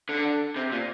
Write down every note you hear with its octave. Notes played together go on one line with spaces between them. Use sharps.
D3
C3
A#2